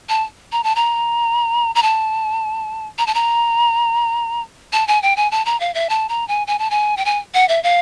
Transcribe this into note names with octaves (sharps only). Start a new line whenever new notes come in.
A5
A#5
A5
A#5
A#5
A5
A#5
A5
A#5
A5
G#5
G5
G#5
A5
A#5
F5
E5
A5
A#5
G#5
G#5
A5
G#5
G5
G#5
F#5
E5
F5